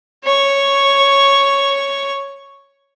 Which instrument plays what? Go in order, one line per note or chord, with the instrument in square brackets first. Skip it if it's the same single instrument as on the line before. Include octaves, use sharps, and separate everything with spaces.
[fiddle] C#5 C#6